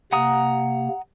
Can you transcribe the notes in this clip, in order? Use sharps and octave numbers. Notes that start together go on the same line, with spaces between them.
C3 A#3 F#5 A#5 D#6